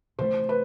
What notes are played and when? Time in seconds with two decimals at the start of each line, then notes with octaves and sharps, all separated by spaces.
0.19 C3 E3 A3 C5
0.49 B4